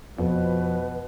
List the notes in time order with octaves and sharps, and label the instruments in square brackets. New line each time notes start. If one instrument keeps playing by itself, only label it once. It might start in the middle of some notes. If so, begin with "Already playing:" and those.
[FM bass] F2 [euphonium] B2 [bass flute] F3 [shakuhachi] B4